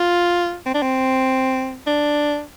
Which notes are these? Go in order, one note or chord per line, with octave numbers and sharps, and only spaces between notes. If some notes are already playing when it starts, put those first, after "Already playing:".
Already playing: F4
C4
D4
C4
D4